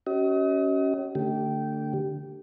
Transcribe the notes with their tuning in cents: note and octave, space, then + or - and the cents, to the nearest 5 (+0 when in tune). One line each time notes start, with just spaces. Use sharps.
C#4 +0 F#4 +45 D#5 +35
D3 +0 A3 +25 G4 -15